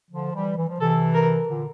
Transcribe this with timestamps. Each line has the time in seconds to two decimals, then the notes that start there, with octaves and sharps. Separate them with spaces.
0.11 D3 F3
0.33 E3 G3
0.56 E3
0.68 F3
0.79 C3 E3 A4
1.14 A#4
1.48 A#2 D3